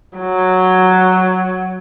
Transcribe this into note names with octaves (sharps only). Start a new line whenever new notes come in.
F#3